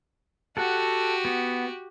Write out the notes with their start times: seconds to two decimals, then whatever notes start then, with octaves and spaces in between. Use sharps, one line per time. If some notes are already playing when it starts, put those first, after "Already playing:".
0.57 F#4 G4 A4 F#5
1.25 B3